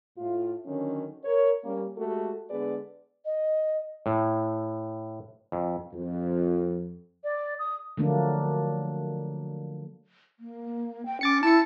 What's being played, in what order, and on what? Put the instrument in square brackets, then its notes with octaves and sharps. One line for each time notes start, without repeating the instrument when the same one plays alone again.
[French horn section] A2 F4
D3 D#3 F#3 C#4
A#4 C#5
G3 A#3 C#4
G#3 A3 F#4 G4 A4
D3 G#3 B3 G#4 B4 D5
[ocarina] D#5
[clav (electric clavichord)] A2
F2
[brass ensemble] F2
[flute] D5
D#6
[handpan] D3 F3 F#3 A3 A#3 D4
[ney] A#3
G5
[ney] C#4 [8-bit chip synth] D6 A6 C#7
[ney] E4 [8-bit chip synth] A5 C#7